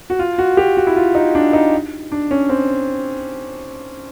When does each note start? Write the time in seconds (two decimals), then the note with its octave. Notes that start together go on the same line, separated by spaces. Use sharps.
0.10 F#4
0.19 F4
0.38 F#4
0.57 G4
0.77 F#4
0.87 E4
0.96 F4
1.15 D#4
1.35 D4
1.53 D#4
2.12 D4
2.31 C#4
2.49 C4